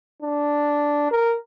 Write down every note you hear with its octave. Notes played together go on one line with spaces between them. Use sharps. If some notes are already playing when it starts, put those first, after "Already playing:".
D4
A#4